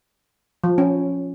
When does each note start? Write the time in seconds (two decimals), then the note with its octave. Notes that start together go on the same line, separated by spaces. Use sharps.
0.64 F3
0.78 C#4